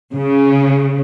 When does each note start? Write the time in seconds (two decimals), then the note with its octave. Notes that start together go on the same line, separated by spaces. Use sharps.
0.14 C#3